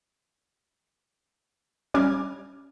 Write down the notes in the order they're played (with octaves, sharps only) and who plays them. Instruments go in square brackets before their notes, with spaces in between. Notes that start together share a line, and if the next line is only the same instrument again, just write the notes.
[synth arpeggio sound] G3 C#4 D6 F6 G#6